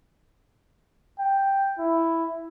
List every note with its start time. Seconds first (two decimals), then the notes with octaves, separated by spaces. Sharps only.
1.20 G5
1.79 E4